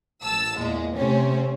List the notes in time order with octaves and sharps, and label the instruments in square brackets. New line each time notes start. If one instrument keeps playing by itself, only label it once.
[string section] A1 A5 E6
E2 A#2 G#3
C3 A3 C4 C#4